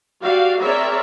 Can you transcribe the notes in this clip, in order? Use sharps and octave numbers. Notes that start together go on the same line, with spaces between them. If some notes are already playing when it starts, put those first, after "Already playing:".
F#4 G4 D5 F5
C4 G#4 A#4 C#5 D5 E5